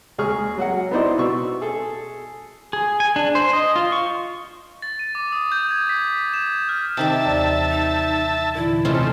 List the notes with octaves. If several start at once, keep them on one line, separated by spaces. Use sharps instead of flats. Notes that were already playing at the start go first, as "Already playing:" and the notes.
D#2 G#3 G#4 C#6 F6
F#3 F#4 F#5
B3 D#4 E4 C5 D5 D#5
B2 C#6 E6
G#4 A4
G#4
G#5
D4
C5
D#5
F4
C#6
A6
D#7
D6
D#6
G6
G#6
B6
E7
F6
C3 D#3 E5 G5 A5 D6
D#2 E3 D5
D#4
A#2 D3 E3 E4
C3 G#3 A3 C#4 F4